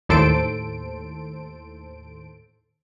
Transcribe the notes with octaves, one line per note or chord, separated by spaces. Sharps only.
D#2 A2 A4 C5 D7